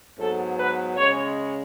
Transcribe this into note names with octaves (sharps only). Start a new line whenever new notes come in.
G#2 F#3 B3 A4
B4
C#3 G#3 C#4 C#5